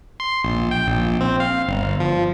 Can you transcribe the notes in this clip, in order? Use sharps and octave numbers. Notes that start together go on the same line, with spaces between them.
C6
A#1
G5
A#1
C4
F5
G1
F3